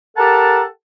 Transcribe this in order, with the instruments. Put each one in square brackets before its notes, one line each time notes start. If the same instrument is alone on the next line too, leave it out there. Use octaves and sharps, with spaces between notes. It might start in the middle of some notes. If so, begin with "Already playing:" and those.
[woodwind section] G4 A4 A#4 F#5 A5 A#5